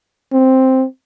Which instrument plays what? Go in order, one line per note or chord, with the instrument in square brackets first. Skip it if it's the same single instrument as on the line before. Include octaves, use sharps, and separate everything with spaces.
[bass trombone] C4